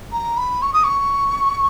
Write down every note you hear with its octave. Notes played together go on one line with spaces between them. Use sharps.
A#5
B5
C#6
D#6
C#6